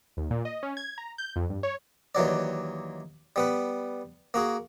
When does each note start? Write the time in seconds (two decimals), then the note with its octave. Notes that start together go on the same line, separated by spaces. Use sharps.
0.17 D#2
0.30 A#2
0.45 D#5
0.63 C#4
0.77 G#6
0.98 A#5
1.18 G6
1.36 F2
1.50 G2
1.63 C#5
2.15 D#2 E3 F#3 D5
3.36 G3 B3 B4
4.34 A#3 F#4 G#4